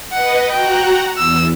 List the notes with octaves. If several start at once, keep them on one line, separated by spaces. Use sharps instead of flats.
B4 D#5 F#5
F#4 F#5 G5 A#5
E2 E6